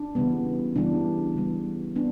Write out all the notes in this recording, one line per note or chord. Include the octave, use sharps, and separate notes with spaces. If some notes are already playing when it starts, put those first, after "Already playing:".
Already playing: D4
C#3 E3 G3 B3
C#3 E3 G3 B3 D4
C#3 E3 G3 B3
B3 D4